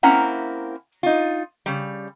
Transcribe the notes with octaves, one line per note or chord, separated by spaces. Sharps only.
A#3 C4 C#4 E4 F#5 A#5
D#4 F4
C#3 G3